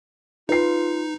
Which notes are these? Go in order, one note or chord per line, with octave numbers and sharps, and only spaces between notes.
D#4 F4 B4 C7